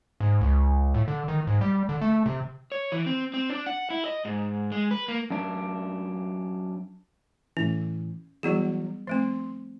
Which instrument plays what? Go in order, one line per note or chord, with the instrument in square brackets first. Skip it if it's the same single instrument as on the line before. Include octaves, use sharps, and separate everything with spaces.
[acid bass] G#2
C#2
A2
D3
D#3
G#2
G3
D3
A3
C3
[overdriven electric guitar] C#5
E3
C4
C4
D4
F#5
E4
D#5
G#2
G#3
B4
A#3
[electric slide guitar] F#2 D4
[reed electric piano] A2 E3 [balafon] C#4
[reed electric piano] E3 F#3 [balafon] G3 B3 G#4
[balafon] F3 A3 C4 [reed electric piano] C6